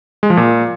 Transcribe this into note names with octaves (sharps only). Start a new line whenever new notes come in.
G#3
F3
A#2